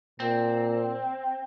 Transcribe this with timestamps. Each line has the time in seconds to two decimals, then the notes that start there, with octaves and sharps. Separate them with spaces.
0.20 A#2 C4